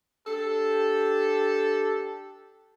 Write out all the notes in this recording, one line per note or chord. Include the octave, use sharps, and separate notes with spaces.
D4 G4 A4